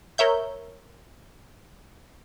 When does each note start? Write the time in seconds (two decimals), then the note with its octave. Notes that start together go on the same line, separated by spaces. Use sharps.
0.18 A#4 C#5 E5 G6